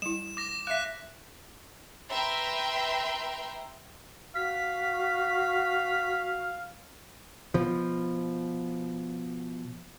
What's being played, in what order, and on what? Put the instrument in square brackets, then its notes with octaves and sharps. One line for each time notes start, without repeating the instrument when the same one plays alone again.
[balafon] G3 E4 [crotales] E7
[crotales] D6 A#6
[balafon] E5 F5 [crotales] F#6 B6
[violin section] B4 E5 G5 A#5 C6
[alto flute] F#4 [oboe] F5 [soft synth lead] B6
[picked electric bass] B2 F3